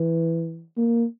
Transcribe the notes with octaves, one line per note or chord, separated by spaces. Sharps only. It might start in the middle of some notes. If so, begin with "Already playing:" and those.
Already playing: E3
A#3